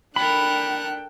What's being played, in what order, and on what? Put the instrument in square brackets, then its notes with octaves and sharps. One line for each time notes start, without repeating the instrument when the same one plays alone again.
[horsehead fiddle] D4 G5 [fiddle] A4 A#4 [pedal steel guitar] B5 [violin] F#6